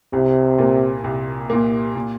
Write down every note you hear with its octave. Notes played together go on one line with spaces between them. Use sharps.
C2 C3
A#2 A#3
C2
A#2 A#3
A#2